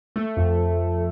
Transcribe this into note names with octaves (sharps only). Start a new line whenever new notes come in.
A3
F2